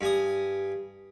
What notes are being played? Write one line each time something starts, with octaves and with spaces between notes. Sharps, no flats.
G2 G#5 D#6